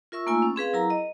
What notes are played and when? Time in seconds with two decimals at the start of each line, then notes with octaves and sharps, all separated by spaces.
0.12 F4 A#4 E5 C#6 E6
0.26 A3 A#3 D#4 F4 G#5 E6
0.42 C#4
0.56 C4 G#4 B4 F5
0.73 F#3 E4 A#4 A#5
0.90 D#5